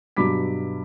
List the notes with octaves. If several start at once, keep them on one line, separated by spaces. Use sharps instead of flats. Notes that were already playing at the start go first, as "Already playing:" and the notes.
G2 B2 F#3 B5 D6 B6